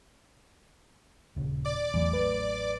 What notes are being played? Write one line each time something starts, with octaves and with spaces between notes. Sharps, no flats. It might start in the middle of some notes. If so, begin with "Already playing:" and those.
D#1 C#3
D5 D6
A1 E2 F#3 A3
B4